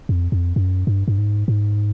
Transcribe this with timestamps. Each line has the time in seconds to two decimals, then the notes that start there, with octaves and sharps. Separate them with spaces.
0.09 F2
0.32 F2
0.56 F#2
0.87 G2
1.08 G2
1.18 G#2
1.48 G#2